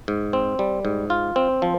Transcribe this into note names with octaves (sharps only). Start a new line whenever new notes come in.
G#2
C4
G3
G#2
F4
C4
F3